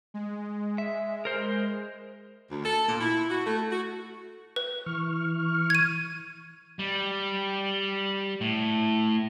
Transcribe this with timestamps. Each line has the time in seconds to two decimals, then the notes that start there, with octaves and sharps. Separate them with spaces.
0.14 G#3
0.78 E5
1.25 A#4 C5
2.50 D2
2.64 A4
2.87 A#2
3.00 E4
3.29 F#4
3.45 A3
3.70 F#4
4.56 B4
4.86 E3 C#6 F6
5.70 G#6 D#7
6.79 G3
8.41 A2